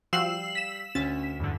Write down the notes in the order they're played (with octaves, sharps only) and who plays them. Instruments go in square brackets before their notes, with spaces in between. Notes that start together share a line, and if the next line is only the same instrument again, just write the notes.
[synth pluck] F3 F#4 [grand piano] G3 G5 [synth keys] F5 [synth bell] E6 C7 F#7
[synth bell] B6 E7
[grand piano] D2 [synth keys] C#4 [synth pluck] A6
[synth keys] E2 G2 D3